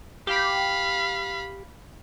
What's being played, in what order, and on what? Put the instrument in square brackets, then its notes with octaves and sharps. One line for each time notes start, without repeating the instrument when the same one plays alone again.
[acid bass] G4 [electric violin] F5 B5